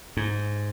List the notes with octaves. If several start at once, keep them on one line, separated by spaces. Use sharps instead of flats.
G#2